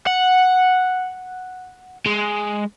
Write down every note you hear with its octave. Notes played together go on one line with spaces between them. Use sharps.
F#5
G#3